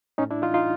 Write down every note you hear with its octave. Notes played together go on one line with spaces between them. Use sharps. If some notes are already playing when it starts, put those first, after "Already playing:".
A2 C#4 D#4
D4 E4
E3 D#4 F4
D#4 F4